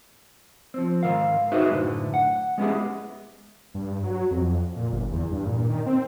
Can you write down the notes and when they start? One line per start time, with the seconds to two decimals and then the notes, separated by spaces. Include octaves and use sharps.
0.74 F3 C4
1.03 G#2 D#3 A#4 F5
1.52 D#4 F#4 G#4 B4 C5 E5
1.70 F#2 A2 D3
2.14 F#5
2.58 G#3 B3 C#4 E4 G4 G#4
3.74 G2
4.03 F#3
4.31 F2
4.76 A#2
4.93 G1
5.12 E2
5.31 G2
5.46 A#2
5.69 D#3
5.86 C4